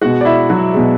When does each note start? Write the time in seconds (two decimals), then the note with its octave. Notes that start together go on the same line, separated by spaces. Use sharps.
0.01 B2 G#3 F#4 F#5
0.21 D5
0.25 E4 E5
0.50 F#3 F#4
0.73 B2 G#3